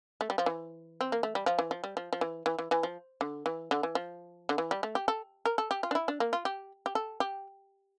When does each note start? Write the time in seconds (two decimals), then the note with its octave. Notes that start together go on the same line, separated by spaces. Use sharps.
0.21 A3
0.30 G3
0.38 F3
0.46 E3
1.01 C4
1.12 A#3
1.23 A3
1.35 G3
1.46 F3
1.59 E3
1.71 F3
1.84 G3
1.97 F3
2.13 F3
2.21 E3
2.46 E3
2.59 E3
2.71 E3
2.83 F3
3.21 D3
3.46 E3
3.71 D3
3.83 E3
3.95 F3
4.49 D3
4.58 E3
4.71 G3
4.83 A3
4.95 G4
5.08 A4
5.45 A#4
5.58 A4
5.71 G4
5.83 F4
5.91 D4
5.95 E4
6.08 D4
6.20 A#3
6.33 F4
6.45 G4
6.86 G4
6.95 A4
7.20 G4